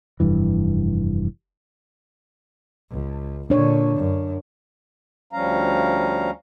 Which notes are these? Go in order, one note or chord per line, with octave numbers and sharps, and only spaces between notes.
F1 G2 E3
C#2
A#2 D3 D4 C#5
F#2
D2 F3 G3 C#4 F5 A#5